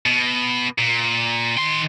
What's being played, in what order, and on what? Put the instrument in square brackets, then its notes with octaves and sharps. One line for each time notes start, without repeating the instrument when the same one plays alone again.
[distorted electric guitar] B2
A#2
D#3 C6